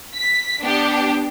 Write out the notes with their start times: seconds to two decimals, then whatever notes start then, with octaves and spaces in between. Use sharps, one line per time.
0.15 B6
0.60 B3 D4 G4